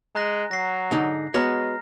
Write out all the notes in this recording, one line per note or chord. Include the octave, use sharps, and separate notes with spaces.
G#3 A#5 F#6 A#6
F#3 A#6 C7
G#2 D3 D#4
G#3 B3 F#4 C#5 A#5 F6 A#6